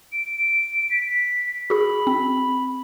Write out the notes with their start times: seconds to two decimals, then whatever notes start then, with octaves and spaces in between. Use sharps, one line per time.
0.13 D7
0.91 B6
1.70 F#4 G#4 B5
2.07 C4